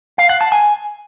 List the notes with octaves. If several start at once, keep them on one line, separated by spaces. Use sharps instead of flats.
F5
F#5
A5
G#5